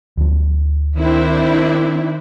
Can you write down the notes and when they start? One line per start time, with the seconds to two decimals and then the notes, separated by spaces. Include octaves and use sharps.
0.17 D2 F3
0.96 D#3 C4 D4 E4